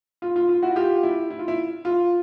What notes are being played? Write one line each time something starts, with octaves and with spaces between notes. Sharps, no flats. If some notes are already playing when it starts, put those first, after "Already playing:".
F4
F4
F4
E4 F#4
F4 G4
E4
E4
F4
E4
F4